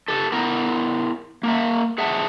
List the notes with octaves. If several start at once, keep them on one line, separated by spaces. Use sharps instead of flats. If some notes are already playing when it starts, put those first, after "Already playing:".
G4 A4
B3 E4 A#4
A#3 A#4 E5
G#4 E5 F#5 A5